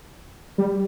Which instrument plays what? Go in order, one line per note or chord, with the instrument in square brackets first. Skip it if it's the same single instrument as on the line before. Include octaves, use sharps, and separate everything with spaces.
[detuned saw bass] G3